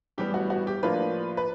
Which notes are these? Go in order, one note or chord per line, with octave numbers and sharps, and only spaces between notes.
A2 E3 G3 B3 G4
F#4
F#4
G4
A2 F3 A#3 D4 F4 B4
B4